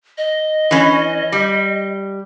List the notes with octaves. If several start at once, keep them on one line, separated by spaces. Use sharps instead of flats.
D#5
E3 C#4
G3